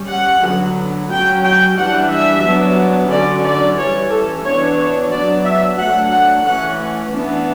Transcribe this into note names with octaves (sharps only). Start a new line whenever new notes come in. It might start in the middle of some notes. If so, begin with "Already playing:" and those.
Already playing: G3 C#4
F#5
D3 F#3 B3
F#3 C#4 G5
G5
E3 G3 D4 F#5
E5
F#3 B3 D4
D3 F#3 C#4 D5
D5
E3 G3 C#4 C#5
A4
E3 B3 D4 C#5
C#5
F#3 B3 D4 D5
E5
F#3 A3 D4 F#5
F#5
E3 A3 C#4 F#5
E3 B3 D4